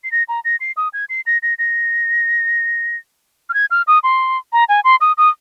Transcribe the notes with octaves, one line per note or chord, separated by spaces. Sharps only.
C7
A#6
A#5
A#6
C7
D#6
G#6
C7
A#6
A#6
A#6
F6
G#6
F6
D#6
C6
A#5
G#5
C6
D#6
D#6